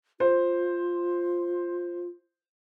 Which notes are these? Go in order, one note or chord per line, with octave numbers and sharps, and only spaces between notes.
F4 C5